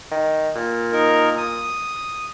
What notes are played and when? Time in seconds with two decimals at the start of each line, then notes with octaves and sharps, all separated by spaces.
0.11 D#3
0.55 A#2
0.93 D#4 A#4
1.37 D#6